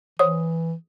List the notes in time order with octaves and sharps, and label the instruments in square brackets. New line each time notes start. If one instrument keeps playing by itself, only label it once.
[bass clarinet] E3 [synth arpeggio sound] C5 C#5 F#5 [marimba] D#6